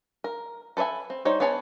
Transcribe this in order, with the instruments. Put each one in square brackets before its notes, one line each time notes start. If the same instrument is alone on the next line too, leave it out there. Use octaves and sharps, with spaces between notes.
[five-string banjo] A#4
A4 B4 C#5 E5 G#5
C4
G3 D#4 C5 C#5
B3 G#4 C#5 G#5 A5